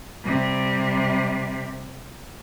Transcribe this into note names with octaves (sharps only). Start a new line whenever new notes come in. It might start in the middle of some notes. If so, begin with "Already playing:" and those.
C3 G3